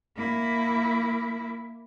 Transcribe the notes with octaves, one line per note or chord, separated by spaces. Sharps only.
A#3 E4